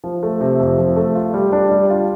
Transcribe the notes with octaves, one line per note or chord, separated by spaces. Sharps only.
F3
A3
C3
F2
F3
A3
F4
G3
D4
G3
F4